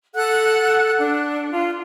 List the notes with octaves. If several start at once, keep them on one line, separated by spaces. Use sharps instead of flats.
A4 F#5 F#6
D4
F4